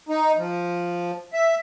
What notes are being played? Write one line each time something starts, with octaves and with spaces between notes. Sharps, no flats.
D#4
F3
E5